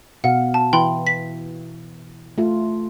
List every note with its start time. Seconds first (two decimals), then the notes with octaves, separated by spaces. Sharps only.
0.24 B2 F5 F#5
0.54 A5
0.73 E3 E4 G5 B5 C6
1.07 B6
2.38 A3 F4